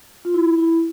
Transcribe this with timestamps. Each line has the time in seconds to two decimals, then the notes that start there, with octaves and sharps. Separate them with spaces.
0.25 F4
0.34 E4
0.58 E4